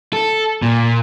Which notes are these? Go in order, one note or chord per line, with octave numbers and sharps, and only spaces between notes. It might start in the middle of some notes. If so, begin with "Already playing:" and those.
A4
A#2